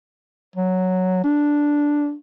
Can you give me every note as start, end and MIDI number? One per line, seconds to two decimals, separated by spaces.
0.56 1.20 54
1.24 2.14 62